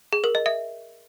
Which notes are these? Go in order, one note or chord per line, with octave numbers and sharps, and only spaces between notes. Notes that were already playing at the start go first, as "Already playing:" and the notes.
G#4
A#4
D#5
E5